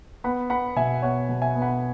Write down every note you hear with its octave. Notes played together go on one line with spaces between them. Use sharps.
B3 F#5 B5
B3 F#5 B5
B2 E5 G#5
B3 C#5 F#5
B2
E5 G#5
B3
F#5 B5